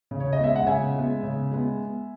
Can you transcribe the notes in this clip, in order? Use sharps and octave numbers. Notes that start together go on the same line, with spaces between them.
C#3
C#5
D#5
G#3 B3 E5
F#5
C#3 E5 G#5
G#3 B3
C#3
G#3 B3